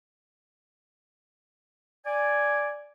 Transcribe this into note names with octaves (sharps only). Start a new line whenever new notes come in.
D5 G#5